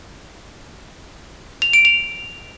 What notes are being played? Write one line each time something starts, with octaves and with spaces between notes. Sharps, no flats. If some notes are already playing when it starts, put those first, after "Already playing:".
F7
D7
F7